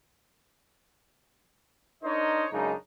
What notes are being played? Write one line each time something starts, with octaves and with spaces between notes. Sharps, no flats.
D4 D#4 A#4 C5 C#5 D#5
F#2 C#3 G#3 D4 D#4